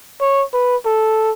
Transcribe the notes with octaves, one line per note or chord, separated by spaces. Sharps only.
C#5
B4
A4